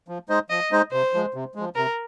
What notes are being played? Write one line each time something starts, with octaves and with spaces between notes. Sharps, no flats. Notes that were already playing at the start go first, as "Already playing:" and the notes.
F3
G#3 D#4 C5 D#5
F3 D#5
G#3 D#4 C5 D#5
C3 C5
F3 G#3
C3
F3 G#3
C3 A#4